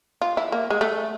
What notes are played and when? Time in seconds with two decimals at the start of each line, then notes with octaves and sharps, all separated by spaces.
0.22 F4
0.37 E4
0.52 A#3
0.70 G#3
0.81 A3